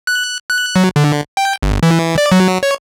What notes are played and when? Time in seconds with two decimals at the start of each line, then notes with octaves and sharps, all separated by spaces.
0.07 F#6
0.50 F#6
0.76 F#3
0.96 D3
1.37 G5
1.63 G1
1.83 E3
2.18 D5
2.32 F#3
2.63 C#5